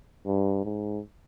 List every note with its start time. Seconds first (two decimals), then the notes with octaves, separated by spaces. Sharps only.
0.26 G2
0.65 G#2